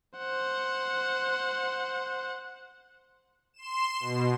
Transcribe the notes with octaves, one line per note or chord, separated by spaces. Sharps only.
C5 F#5
C6 E7
B2